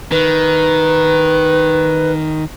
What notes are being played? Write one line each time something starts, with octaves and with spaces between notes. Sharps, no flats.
D#3 B4